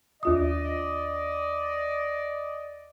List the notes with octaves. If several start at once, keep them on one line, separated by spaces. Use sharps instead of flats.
D#2 F4 D5 D#5 D#6